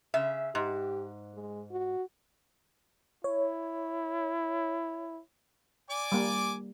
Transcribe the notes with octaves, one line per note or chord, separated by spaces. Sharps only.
C#3 E5
G#2 G4
G#3
F#4
E4 C#5
D5 G#5 D6
G3 A#3